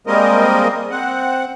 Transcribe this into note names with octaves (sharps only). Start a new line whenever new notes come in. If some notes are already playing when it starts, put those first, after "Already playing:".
G3 G#3 A#3 C4 A#4 D#5
C4 F#5